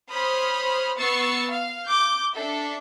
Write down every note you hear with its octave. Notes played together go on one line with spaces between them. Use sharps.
C5 C#5 B5 D#6 F6
B3 C#6 E6 A6 C7 C#7
F5
D6 G6
D4 A4 E5